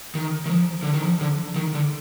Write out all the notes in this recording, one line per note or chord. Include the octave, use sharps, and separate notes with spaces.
D#3
D#3
F3
D3
D#3
F3
D3
D#3
D3